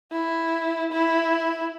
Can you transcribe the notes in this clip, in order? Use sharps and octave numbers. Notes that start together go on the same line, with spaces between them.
E4
E4